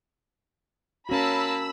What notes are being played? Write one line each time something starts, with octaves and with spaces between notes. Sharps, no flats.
A#3 C#4 F#4 A5 B5 E6